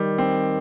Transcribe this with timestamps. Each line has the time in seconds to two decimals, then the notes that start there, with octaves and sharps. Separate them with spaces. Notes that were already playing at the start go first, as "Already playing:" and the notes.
Already playing: D#3 G3
0.18 C4